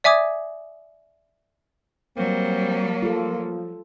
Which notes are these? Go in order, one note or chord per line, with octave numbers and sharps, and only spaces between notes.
D5 E5 G#5 D6 D#6 G#6
F#3 G3 A#3 C4
F3 F4 A4